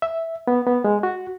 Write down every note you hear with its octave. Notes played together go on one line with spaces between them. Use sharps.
E5
B3
B3
G#3
F#4